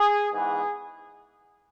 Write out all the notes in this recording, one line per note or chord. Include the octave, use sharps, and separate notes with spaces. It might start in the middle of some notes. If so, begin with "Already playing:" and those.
Already playing: G#4
G#2 E3 B3 G#4